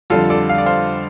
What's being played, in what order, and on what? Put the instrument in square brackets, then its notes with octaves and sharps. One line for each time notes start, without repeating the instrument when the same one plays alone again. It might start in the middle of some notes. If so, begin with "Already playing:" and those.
[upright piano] F2 D3 G3 [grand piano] F4 A4
[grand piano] A4 D5
F5
D5
C5 F5